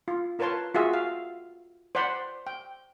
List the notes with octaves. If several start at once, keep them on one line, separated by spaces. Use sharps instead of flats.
F4
F4 A#4 B4 C#5 A5 C6
F4 F#4 G#4 E5
F5
C5 D5 F#5 B5 C6
G5